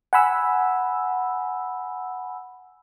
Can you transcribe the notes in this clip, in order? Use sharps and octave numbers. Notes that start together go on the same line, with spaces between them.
F#5 G#5 B5 E6